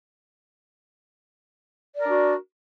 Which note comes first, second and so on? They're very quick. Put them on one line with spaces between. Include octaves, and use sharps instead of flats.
D5 A#4 D4 F#4